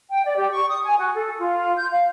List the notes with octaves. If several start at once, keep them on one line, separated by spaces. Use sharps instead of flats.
G5
D5
G4
C#6
D#6
G#5
F#4
A4
F4
G6
F5